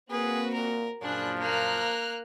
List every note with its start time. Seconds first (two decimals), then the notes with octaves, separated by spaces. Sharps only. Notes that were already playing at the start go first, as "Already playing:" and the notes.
0.11 A#3 C4 F#4 G#4 B4
0.54 A#2 A#4
1.02 F#2 A#2 F3 D4 G#4 B5 F#6
1.40 A#3 A#5 F6 F#6